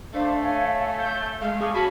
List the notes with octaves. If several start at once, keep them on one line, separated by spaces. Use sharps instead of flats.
A3 D4 C5 F5
C#5 G#5
G6
G#3 A3 F5
G#4 A4 D5 D#5 F5 C#6
A#3 C#4 F#4 A5 B5